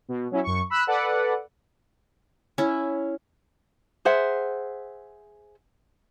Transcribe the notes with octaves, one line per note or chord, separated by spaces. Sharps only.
B2
F#3 C#4 E4
F#2 C#6
B5 E6 F#6
A4 B4 D5 F#5
C#4 E4
G#4 C5 E5 F#5